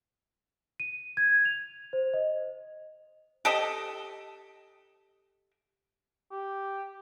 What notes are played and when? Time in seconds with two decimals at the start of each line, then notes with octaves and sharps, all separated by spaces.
0.80 D#7
1.17 G#6
1.45 F7
1.93 C5
2.14 D#5
3.45 G4 A4 D#5
6.31 G4